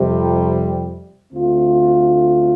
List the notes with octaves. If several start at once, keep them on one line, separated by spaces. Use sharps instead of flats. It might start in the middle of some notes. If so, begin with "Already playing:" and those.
Already playing: F2 C3 G3
D2 D3 A3 C4 F4